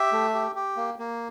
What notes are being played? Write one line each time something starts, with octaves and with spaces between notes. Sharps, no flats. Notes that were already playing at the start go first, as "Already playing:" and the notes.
Already playing: G4 E5
A3
G4
G4
A#3
A#3